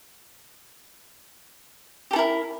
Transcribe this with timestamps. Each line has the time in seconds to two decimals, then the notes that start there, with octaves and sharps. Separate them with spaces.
2.11 G4
2.13 A4
2.16 E4
2.19 A#4